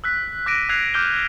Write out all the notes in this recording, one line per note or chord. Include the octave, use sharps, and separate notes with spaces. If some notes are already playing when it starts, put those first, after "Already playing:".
E6 F#6 B6
D6 F#6 A#6 D7 D#7
E6 F#6 G#6 C7 F7
D6 F6 G6 G7